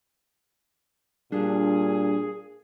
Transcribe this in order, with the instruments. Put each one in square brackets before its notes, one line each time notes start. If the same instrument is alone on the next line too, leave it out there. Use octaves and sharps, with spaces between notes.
[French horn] A#2 [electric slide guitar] G3 [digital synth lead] D4 [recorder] G#4